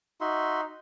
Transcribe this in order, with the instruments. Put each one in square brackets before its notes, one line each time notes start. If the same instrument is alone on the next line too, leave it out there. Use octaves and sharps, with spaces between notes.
[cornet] D#4 [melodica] F#4 E5 C6